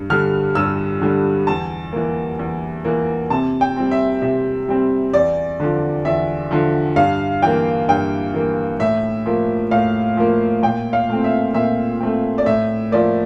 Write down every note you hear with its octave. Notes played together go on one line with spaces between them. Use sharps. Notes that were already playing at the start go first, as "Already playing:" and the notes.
Already playing: G2
D3 G3 F6
G2 E6
D3 G3
E2 A5
E3 A#3
E2
E3 A#3
C3 A5
G5
G3 C4
E5
C3 E5
G3 C4
E2 D5
D3 F3
E2 E5
D3 F3
G2 F5
E3 A#3 G5
G2 G5
E3 A#3
A2 E5
F3 A#3
A2 F5
F3 A#3
A#2 G5
F5
A3 C4
E5
A#2 E5
A3 C4
D5
A2 E5
F3 A#3 D5